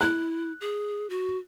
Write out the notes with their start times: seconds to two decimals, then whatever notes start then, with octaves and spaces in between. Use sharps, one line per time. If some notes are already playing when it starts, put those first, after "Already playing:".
0.01 E4 F#6
0.61 G#4
1.10 F#4